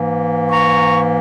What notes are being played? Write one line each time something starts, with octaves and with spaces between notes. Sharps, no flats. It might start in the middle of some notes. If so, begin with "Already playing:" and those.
Already playing: G#2 E3 A#3
A#5 C#6